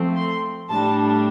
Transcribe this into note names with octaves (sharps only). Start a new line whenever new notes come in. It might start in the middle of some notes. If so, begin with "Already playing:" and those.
Already playing: F3 A3 C4
C6
A2 G3 D4 A5